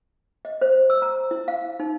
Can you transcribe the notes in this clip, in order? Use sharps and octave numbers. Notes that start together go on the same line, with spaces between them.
D#5
C5
E6
A#5
E4
F5
D#4